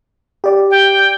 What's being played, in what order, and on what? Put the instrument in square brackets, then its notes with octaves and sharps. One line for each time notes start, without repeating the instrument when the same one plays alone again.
[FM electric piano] G4 D5
[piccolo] G5